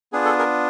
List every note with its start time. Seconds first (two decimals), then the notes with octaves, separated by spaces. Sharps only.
0.13 B3 D4 F4 G#4
0.25 A4
0.38 G#4 A#4